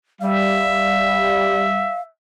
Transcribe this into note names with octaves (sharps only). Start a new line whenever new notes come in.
G3 E5 F5